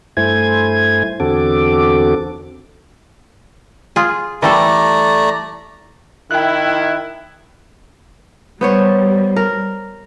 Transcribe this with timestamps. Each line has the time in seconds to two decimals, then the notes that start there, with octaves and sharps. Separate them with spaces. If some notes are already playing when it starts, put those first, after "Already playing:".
0.17 G2 A3 E4 C5 G#5 G#6
1.20 E2 D3 C4 F#4 A4 D6
3.96 F4 G#4
4.42 E3 G3 A3 A4 D5 A#5
6.31 D#3 E4 G5 F#6
8.61 G3 B3 C5 C#5
9.36 A#4